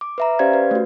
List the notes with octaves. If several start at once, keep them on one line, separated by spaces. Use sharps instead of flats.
D6
B4 E5 A#5
C#4 G4 C5 D5 F5 G#6
B4
A3 F#4